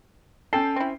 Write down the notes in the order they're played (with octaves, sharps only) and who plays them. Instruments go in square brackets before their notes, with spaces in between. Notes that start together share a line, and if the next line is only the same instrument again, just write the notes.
[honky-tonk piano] C#4 G5 C7 [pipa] A4
[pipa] C4 E4